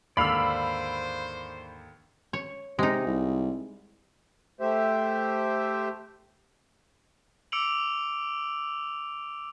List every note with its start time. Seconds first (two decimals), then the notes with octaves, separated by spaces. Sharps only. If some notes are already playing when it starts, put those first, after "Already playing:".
0.17 D#2 G#2 D3 C5 D5 F5 B5 E6
2.33 C#5
2.79 C3 G#3 D#4
3.07 C2
4.61 A3 G4 C5 E5
7.52 D6 E6 C#7 D7 F7 F#7